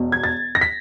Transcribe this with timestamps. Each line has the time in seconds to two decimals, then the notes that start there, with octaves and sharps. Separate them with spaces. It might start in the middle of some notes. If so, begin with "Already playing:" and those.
Already playing: E1 E2 B2
0.12 G#6
0.24 A6
0.55 A#6
0.61 B6